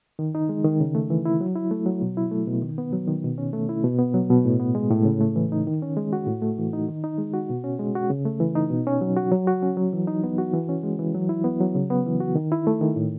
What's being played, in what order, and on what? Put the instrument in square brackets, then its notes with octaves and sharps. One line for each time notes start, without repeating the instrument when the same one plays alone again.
[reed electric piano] D#3
D#4
G#3
D#3
C#3
A3
E3
E4
F#3
E4
A3
F#3
B2
E4
A3
B2
D#3
B3
F#3
D#3
B2
C#4
A3
E4
B2
B3
F#3
B2
A2
B3
G#3
A2
C#3
A3
E3
D#4
D#3
C#4
G#3
F#4
A2
A3
E3
D#4
D#3
D#4
G#3
F#4
B2
C#4
G#3
F#4
C#3
A3
E3
D#4
B2
C#4
F#3
F#4
F#3
F#4
C#4
F#3
E3
D#4
B3
F#4
E3
C#4
G#3
E3
F#3
E4
B3
F#3
C#3
B3
E3
F#4
D#3
E4
A3
D#3
A2